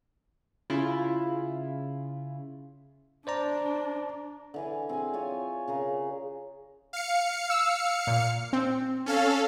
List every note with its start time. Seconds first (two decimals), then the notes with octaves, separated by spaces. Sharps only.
0.70 C#3 E4 F4
3.27 D4 C5 D5 A#5
4.54 D3 E3 G#5
4.89 C4 G#4 G#5
5.13 F4 C#5 G#5
5.68 C#3 G#4 A#4
6.93 F5 C#7
7.50 E6
8.07 A#2
8.53 C4
9.06 C#4 A4 F5